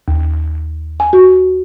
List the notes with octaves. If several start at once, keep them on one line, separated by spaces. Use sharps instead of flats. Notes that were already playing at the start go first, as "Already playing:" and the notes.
D#2
G#5
F#4